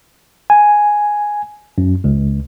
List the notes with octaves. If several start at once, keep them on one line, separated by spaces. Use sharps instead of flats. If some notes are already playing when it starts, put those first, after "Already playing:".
G#5
F#2
C#2